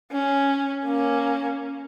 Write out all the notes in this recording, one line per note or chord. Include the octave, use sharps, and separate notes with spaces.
C#4
A#3 C#4